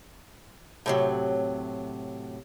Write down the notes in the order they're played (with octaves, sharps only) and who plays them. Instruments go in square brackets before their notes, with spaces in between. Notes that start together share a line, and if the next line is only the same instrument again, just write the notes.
[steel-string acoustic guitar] A2 C3 F#3